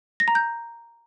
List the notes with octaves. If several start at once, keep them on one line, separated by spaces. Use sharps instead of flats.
A#6
A#5
G6